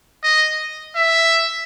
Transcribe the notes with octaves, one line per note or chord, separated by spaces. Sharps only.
D#5
E5